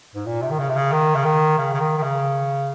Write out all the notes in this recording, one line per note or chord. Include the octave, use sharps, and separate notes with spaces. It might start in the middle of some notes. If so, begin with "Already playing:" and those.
G#2
A#2
C3
D#3
C#3
C3
C#3
D#3
C#3
D#3
C#3
C#3
D#3
D#3
C#3